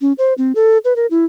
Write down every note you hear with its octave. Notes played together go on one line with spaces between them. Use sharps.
C#4
C5
C4
A4
B4
A#4
E4